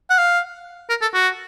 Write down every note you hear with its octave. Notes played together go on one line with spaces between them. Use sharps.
F#5
F5
A#4
A4
F#4